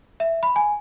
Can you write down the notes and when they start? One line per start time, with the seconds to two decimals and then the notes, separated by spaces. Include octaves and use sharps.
0.20 E5
0.43 B5
0.56 G#5